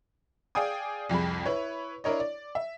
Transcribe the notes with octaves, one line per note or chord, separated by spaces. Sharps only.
G#4 D5 F5 G5 G#5 D#6
C2 F2 G#4 B5
E4 B4 C#5
D4 E4 A#4 C#5 D#5
D5
E5